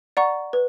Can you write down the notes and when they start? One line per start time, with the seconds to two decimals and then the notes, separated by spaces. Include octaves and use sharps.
0.17 D5 F#5 A#5 C#6
0.53 B4